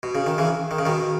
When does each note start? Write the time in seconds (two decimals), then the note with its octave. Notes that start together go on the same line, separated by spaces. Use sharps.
0.03 B2
0.15 C#3
0.26 D#3
0.38 C#3 E3
0.71 D#3
0.79 C#3
0.85 B2 D#3